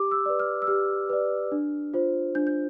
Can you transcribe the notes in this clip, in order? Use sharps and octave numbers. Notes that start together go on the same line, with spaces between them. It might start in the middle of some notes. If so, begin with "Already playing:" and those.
Already playing: G4 D6
E6
B4 D5
F6
E6
G4 F6
B4 D5
D4
F4 C5
D4 G6
G6